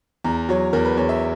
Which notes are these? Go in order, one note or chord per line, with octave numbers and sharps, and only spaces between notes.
E2 A#5
F#3 C#5
E2 A#4
B4
E2 C#5
E5